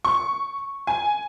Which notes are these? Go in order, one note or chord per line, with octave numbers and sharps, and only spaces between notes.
C#6
G#5